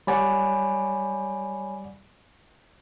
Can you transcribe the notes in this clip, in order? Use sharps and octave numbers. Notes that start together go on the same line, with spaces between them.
G3 C#5 D5 F#5 G#5 B5